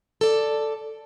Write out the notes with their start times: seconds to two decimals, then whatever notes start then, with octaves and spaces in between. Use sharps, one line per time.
0.21 A4 D5